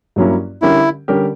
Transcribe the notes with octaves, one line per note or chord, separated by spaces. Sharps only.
G2 F#3 A#3 C#4 E4
D3 G3 C#4 E4 G4 A#4
D3 G3 C#4 G4 A#4